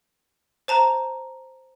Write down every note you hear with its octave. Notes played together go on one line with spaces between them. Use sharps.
C5 A5 A#5